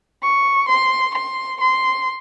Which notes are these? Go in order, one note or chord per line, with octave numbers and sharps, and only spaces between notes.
C#6
C6
C6
C6